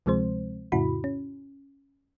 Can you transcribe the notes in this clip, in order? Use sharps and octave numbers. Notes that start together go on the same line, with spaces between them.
D2 C3 F3 G#3 C4 C5
F2 A2 C#3 E4 F#4 B5
C#4